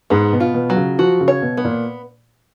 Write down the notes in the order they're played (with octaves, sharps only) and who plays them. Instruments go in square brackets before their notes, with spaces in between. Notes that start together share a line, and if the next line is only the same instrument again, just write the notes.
[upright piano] G#2 [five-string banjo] B3
[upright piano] B2
[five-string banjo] F4
[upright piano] B2
[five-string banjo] F#3
[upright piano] C#3
[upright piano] F3 [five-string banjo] F#4
[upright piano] C#3
[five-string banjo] C#5
[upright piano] B2
[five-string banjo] B3
[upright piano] A#2